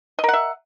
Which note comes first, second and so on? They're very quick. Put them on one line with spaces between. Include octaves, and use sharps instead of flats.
D#5 A#4 F#5 E5